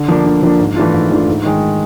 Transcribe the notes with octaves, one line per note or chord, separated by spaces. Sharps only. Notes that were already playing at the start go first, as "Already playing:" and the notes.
Already playing: D3
F3 A#3 D4
D3
F3 A#3 D4
G#2
E3 A3 D4 F4
G#2
E3 A3 D4 F4
G#2
D#3 G#3